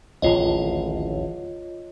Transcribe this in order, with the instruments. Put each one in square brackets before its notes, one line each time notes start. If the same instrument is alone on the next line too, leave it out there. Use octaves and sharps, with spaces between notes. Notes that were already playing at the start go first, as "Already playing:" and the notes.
[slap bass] D1 A1 D#2 [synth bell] F4 C#5 D#5